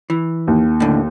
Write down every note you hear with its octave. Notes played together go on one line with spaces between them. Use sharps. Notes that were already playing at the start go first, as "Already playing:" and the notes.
E3
D#2
A2 D3